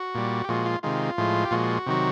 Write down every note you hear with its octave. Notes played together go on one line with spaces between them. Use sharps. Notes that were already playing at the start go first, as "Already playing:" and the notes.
Already playing: F#4
A#2 G3
G4
A#2 F3 G#3 F#4
F4
C3 D#3 G#3 F4
A2 F3 G#3
G4
A#2 F3 G#3 F#4
C3 D#3 F#3